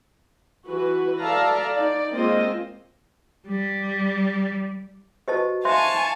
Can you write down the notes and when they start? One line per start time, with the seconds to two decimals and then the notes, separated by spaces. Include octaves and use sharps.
0.69 E3 F#4 B4
1.21 A4 D5 E5 F5 A5 A#5
1.76 D#4 D5
2.14 G#3 A#3 C4 F4 C5 D#5
3.48 G3
5.28 F#4 G4 B4 C5 D#5 A5
5.65 C5 E5 F5 G#5 A5 C6 C#6